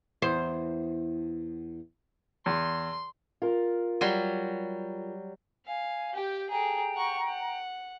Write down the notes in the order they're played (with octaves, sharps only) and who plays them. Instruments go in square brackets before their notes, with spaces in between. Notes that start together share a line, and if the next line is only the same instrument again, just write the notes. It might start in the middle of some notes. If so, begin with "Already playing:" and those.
[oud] E2 C5
[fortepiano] E2 [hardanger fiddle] C6
[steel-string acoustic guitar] F4 A#4
[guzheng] F#3 G3 C6
[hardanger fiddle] F5 [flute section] G#5
[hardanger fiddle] G4 G5
[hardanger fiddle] G#4 A4 [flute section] G5 A#5
[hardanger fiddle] F#5 C#6
F#5